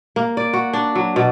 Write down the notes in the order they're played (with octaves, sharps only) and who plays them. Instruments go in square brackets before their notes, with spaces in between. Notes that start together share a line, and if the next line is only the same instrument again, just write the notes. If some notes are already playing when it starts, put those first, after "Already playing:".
[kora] A#3
D5
F#4
D4
F#3
B2